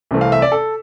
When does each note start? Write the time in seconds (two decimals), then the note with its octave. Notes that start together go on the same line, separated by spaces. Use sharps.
0.11 C2 C3 E3 A3 C4
0.21 F5
0.32 E5
0.42 D5
0.52 A4